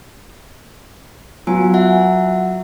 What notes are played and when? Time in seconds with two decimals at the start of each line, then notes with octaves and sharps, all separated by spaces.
1.47 F#3 B3 F4 G#5
1.74 E5 F#5